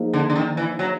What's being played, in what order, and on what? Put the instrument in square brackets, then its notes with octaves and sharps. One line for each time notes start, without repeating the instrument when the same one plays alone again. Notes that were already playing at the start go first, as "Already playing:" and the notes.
Already playing: [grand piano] F3 A#3 D#4 G#4 C5
[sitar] D3
D3
D#3
E3
F#3